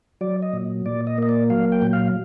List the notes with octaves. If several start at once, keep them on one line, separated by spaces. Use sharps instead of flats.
F#3 D5
D#5
A#2
A#2 D5
D#5
A#3 D#5
D5
F#3 F5
G5
A#2
F5